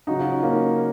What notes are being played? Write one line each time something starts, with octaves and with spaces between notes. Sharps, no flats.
C#3 F#3 D#4 F#4
C#4 F4
A#3 C#4